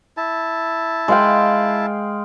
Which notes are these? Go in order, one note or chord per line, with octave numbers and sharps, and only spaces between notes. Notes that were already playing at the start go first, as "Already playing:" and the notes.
E4 A5
G#3 F5 G5